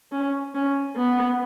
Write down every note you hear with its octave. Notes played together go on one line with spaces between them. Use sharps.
C#4
C#4
B3